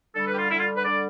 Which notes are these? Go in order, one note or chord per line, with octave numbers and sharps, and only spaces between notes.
D3 G3 A4
B4
G4
F4
D3 G3 E4
F4
B4
D3 G3 D5